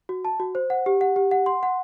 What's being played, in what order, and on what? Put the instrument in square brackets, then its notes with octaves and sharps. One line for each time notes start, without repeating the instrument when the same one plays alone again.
[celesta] F#4
A5
F#4
C5
F#5
G4
F#5
G4
F#5
C6
F#5